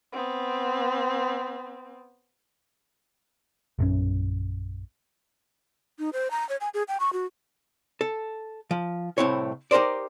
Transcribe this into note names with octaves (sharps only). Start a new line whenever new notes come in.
B3 C4
A#1 F#2 D3 C#4
D#4
C5
A#5
C#5
G#5
G#4
G5
C#6
F#4
A4
F3
C2 F#2 A2 C4 E4 C#5
D#4 G4 A#4 C5 D5